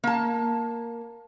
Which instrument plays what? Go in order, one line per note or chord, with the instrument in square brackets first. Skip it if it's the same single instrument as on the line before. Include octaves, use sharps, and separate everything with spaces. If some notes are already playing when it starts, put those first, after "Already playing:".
[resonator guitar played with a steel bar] A#3 A5